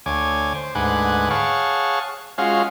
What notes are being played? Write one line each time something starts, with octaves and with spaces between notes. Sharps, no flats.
D2 C#5 G#5 D6
C5
D2 G#2 B4 F#5 G#5 D6
G#4 C#5 F5 F#5 A5 C#6
G#3 C#4 F4 F#4 F5